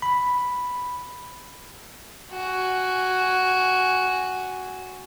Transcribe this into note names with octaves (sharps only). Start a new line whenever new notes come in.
B5
F#4 G#5